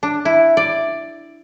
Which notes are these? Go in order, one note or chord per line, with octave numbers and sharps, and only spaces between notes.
D4
E4
D5